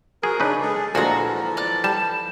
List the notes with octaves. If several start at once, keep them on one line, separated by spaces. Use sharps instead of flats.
F3 F#4 G#4 A#4
C#3 D4 D#4 B4
G#3 G#4 A4
D2 A#2 E3 F3 G#3 F#4 A4 A#5
D5 F#6
G3 A5